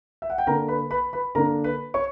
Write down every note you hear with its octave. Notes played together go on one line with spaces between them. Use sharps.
E5
F#5
G5
D3 A#3 D4 A#4 A#5
B4 B5
B4 B5
B4 B5
D3 A#3 D4 A#4 A#5
B4 B5
C#5 C#6